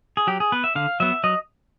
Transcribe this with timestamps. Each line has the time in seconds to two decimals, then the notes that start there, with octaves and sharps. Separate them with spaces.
0.17 G#4
0.27 F#3 G4
0.40 G#4
0.52 B3 B4
0.64 E5
0.75 D3 F5
1.00 F#3 B3 E5
1.24 F#3 D#5